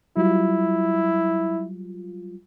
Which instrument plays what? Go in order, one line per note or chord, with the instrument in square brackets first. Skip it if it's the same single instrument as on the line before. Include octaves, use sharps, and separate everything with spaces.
[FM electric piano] F#3 G3 F4 [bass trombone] E4